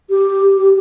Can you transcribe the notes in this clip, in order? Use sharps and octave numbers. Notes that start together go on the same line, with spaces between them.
G4
G4